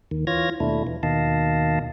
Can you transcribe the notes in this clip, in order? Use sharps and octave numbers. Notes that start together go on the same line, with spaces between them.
D#2 D#3
E3 F4 C#5 F6 G#6 A#6
D#2 B2 A3 D4 E4
E3
D#2 B2 D#3 D#5 F5 A5